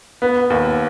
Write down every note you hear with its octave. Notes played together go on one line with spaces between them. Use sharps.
B3
D#2